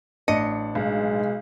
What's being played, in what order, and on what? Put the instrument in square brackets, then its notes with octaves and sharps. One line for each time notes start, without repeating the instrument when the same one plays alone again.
[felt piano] A1 D4 [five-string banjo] D#5 [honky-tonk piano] C#7
[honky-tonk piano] B1 [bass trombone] G#3